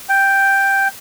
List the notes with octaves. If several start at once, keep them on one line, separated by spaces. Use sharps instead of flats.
G5